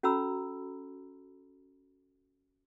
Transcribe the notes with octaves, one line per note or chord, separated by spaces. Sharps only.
C#4 F#4 A4 A#5 B5 E6